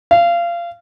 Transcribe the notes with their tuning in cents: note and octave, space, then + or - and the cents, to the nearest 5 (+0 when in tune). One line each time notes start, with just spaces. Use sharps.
F5 -25